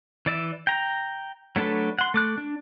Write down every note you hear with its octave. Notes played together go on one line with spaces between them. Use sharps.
E3 D5 E5
G5 A#5
F#3 A3 D4 A4 B4
F#5 C6
A3 D6 F#6
D4